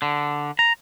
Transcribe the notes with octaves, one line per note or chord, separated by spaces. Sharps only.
D3
A#5